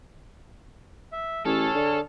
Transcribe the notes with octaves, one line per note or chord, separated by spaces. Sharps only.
E5
A1 G#4 A4 C#5 F6
D3